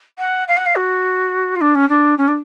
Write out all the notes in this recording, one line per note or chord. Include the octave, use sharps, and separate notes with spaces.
F#5
F5
F#5
F5
F#4
F4
D4
C#4
D4
C#4
D4